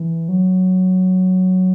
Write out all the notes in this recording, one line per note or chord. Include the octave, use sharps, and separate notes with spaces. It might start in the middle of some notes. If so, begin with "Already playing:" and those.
Already playing: E3
F#3